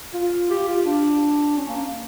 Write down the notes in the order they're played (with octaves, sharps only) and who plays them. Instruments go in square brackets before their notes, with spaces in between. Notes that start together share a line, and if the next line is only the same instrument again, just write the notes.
[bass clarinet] F4
G4
F4
D4
C#4
A#3